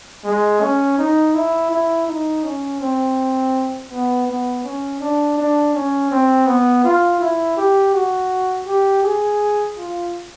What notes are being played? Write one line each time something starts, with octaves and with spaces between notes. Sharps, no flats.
G#3
C#4
D#4
E4
E4
D#4
C#4
C4
B3
B3
C#4
D4
D4
C#4
C4
B3
F4
E4
G4
F#4
G4
G#4
F4